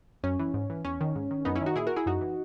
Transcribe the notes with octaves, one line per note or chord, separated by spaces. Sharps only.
F#2 C#4
E3
G#2
E3
E2 C#4
D#3
G#2
D#3
F#2 B3 D#4
C#4 E4
D#3 D#4 F#4
A#2 E4 G#4
F#4 A#4
E4 G#4
F#2 D#4 F#4
E3